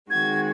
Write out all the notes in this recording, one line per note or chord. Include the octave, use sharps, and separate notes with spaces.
D#3 G#3 C4 F#4 G#6